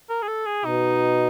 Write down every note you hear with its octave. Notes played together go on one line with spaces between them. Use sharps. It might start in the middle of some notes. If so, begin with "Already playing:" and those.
A#4
G#4
A4
G#4
B2 D#4